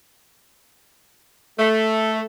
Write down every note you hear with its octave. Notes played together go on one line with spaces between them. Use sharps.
A3